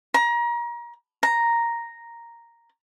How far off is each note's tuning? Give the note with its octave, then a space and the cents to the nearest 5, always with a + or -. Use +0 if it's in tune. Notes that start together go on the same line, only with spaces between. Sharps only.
A#5 +30
A#5 +0